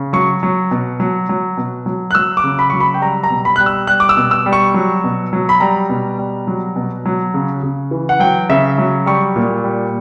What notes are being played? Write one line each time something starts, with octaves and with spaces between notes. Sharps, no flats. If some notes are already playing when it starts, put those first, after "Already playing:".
Already playing: C#3
F#3 C#6
F#3
B2
F#3
F#3
B2
F#3
F#6
F#3 E6
D6
C#3
B5
F#3 C#6
B5
G5
G3 A#5
A#5
B2
B5
G3 F#6
E6
G3 F#6
D6
E6
B2
E6
G3
C#6
F#3
B2
F#3
B5
G3 A#5
B2
G3
F#3
B2
F#3
C#3
C#3
E3
F#5
F#3 G5
C#3 E5
F#3
G3 C#6
A#2
G3